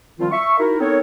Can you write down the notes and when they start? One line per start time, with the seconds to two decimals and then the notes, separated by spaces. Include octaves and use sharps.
0.19 D#3 F3 G3 C4 F4
0.32 E5 C#6
0.59 D#4 E4 F#4 A#4
0.79 B3 C4 D#4 A4 A#4 C#5